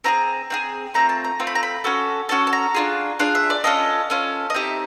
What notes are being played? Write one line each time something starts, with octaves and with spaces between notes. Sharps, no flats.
C4 F4 G#4 A#5
C4 F4 G#4
A3 C4 F4 A#5
A5
A#5
A3 C4 F4
B5
A#5
B5
C#4 F#4 A4
C#4 F#4 A4 A5
A5
A#5
D4 F4 G#4
D4 F4 G#4 F5
E5
D5
C#4 F4 A4 D#5
C#4 F4 A4
D#5
C4 D#4 G4 E5